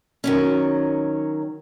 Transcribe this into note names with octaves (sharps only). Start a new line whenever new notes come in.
D#3 F#3 C#4